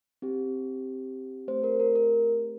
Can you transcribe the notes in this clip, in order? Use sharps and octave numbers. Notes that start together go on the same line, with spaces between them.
C4 G4
A3 C4 G4 C5
A#4
A#4
A#4